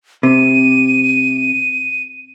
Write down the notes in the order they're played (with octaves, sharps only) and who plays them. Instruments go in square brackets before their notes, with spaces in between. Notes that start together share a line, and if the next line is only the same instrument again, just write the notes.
[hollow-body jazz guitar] C3 [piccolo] D#7